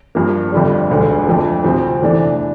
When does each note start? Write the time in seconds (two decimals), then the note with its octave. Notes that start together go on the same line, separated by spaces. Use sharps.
0.15 G2 F3 A#3
0.52 G1 F2 D3 G3
0.90 E1 D2 D3
1.27 F2 D3 A3
1.64 D2 C3 F3 C4
2.02 F1 E2 E3 A3 D4